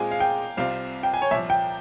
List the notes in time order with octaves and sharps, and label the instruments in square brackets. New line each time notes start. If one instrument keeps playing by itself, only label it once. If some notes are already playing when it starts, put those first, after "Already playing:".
Already playing: [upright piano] A#2 G#3 C4 F4 G#4 [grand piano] G#5
[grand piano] F5
G5
[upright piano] C2 C3 G3 C4 F4 [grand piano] F5
[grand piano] G5
G#5
C#5
[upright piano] C2 A#2 F3 [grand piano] E5
[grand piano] G5